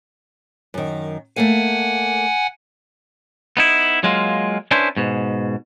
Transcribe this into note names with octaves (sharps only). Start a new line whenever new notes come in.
F#2 D#3
A3 A#3 F5 F#5 G#5
B3 D#4 E4
F#3 G#3 A#3 F4
C#4 D4 E4 B4 C5
G#2 B2